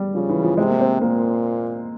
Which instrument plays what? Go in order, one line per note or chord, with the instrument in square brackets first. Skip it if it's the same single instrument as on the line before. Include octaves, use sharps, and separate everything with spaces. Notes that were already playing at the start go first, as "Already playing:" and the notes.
Already playing: [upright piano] G3
[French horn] C#3 [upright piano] F3
[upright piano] E3
F3
[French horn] C3 [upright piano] G#3
[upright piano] A#3
C4
[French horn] A#2 [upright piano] A#3